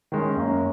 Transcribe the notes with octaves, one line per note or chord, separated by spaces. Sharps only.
D#3 G#3 C#4
F#2 A#3 C#4